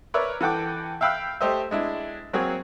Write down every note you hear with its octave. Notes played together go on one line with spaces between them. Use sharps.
A#4 B4 C#5 D5 E5
E3 A4 F#5 G5 D6
E5 F5 G5 B5 E6 F#6
A3 G4 C5 D#5 E5
G#3 D4 E4
F#3 A#3 C4 F#4 G#4